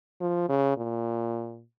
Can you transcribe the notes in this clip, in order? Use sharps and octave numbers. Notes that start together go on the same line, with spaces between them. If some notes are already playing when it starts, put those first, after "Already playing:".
F3
C#3
A#2